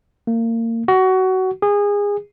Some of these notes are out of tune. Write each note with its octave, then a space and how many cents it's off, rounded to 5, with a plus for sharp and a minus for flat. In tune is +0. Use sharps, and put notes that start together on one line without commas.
A#3 -30
F#4 +20
G#4 -25